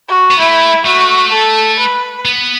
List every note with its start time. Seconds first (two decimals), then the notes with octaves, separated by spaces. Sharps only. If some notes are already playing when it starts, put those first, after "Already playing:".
0.08 F#4
0.31 B3
0.39 A3 E4
0.86 A3 F#4
1.32 A4
1.79 B4
2.25 B3